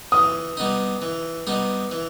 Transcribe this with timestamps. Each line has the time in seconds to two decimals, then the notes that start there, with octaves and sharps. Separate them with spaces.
0.12 E3 D#6
0.57 G3 B3 D#4
1.02 E3
1.47 G3 B3 D#4
1.91 E3